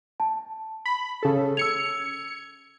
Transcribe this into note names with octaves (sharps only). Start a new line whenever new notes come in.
A5
B5
C#3 A4
E6 G#6 C#7 F7